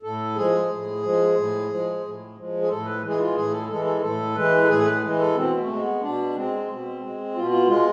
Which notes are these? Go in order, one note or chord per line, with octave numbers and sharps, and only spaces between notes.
A2 A4
F3 G#3 G#4
A2
F3 G#3
A2
F3 G#3
A2
F3 G#3
G#4
A2 A4
B4
E3 G#3
G#4
F4
A2 G#4
A4
E3 G#3 A4
A4
A2 A4
E3 G#3 B4
A4
A2 G#4
B4
E3 G#3
A4
B2 C4
A3
G#3
C4
B3
B2 D4
G#3 C4
B2
G#3
B2 F4
F4
G#3 F4